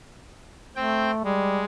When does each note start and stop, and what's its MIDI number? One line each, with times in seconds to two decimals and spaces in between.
0.76 1.21 57
0.76 1.11 60
0.76 1.11 79
1.24 1.63 55
1.24 1.65 56